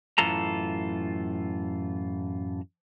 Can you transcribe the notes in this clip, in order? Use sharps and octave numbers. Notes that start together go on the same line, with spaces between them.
F#2 A2 E3 F4 A4 A#5